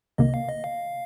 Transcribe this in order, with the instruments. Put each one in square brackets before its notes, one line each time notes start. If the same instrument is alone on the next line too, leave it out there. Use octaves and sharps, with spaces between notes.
[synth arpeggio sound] C2 C3 D#3 A#3 [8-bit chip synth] D#5
[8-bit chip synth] F5
D#5
F5